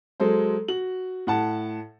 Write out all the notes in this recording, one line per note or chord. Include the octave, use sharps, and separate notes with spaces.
F#3 G#3 A4 C5
F#4 F#7
A2 F#5 A5